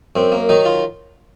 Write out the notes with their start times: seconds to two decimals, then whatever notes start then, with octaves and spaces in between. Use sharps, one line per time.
0.16 F#2 C4
0.32 A#3
0.49 D#3 F#3 D#4
0.65 F4